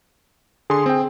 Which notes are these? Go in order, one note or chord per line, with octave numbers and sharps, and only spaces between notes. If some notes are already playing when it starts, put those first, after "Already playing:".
D3 G#4 C6
C4 G5